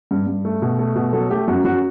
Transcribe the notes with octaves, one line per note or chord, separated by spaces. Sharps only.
G2
G2
A3
B2
A3
B2
F#3 A4
A3 G4
F#2 F#4
F#2 F#4